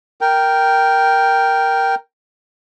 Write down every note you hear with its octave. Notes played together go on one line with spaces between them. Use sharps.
A#4 G5